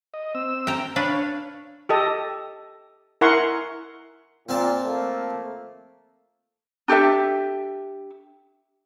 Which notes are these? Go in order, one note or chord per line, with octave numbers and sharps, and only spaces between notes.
D#5
C4 E6
G5 A#5
D4 B4 C#5 F5
G4 A4 D#5
E4 A#4 F#5 G#5 C6 C#6
A#2 C4 F5 A5
F3 A3 A#3
D4 G4 A4 E5